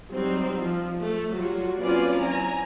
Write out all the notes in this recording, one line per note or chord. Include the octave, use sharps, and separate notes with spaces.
F#3 G3 C4 D#4
F3
A3
F#3 G3 F4 F#4
A#3 C4 C#4 F4 B4 D5
F#3 E4 G#5 A#5